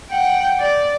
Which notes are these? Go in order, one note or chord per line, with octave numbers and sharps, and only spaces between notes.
F#5 G5
D5